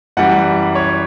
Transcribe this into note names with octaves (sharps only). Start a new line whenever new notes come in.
F#2 E3 G3 F#5
C#5